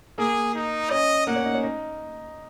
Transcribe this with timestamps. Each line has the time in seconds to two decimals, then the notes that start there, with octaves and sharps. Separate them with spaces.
0.18 A#3 G#4
0.54 D#4
0.90 C#4 D#5
1.27 A#3 F#5
1.36 C#4
1.45 D#4
1.54 C#4
1.63 D#4